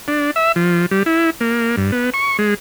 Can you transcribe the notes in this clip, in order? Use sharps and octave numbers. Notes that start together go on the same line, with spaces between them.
D4
E5
F3
G3
E4
A#3
G2
B3
C#6
G#3